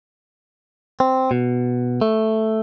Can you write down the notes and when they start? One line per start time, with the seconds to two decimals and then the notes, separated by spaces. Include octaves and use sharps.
1.00 C4
1.31 B2
2.01 A3